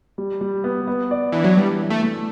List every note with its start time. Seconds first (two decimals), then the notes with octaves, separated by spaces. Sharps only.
0.18 G3
0.41 G3
0.64 B3
0.87 B3
1.11 D5
1.32 E3 D4
1.44 F#3
1.56 E3 G3
1.79 E3
1.90 A3
2.03 A3